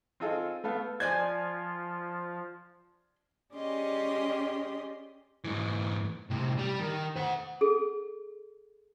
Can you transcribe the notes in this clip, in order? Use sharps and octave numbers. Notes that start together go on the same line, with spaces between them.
C4 D#4 F4 G#4 A4
A3 B3 A4 F5
F3 F4 C5 D5 G#5 G#6
C#4 G4 G#4 D5 D#5 C6
G#2 E3
A2 C3
G3
D#3
C5 F#5
G#4 A4